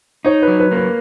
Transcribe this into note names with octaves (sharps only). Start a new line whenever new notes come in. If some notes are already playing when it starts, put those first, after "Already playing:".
D#4 C#5
B4
F#3
B4
A#3
B4